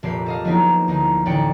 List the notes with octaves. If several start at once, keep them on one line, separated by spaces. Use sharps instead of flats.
F1 A#1 G4 C7
A4 D#5 F5
F3 F#3 A#3 B3 D#4 E4
D2 D#4
A1 D2 D5 G5 C#7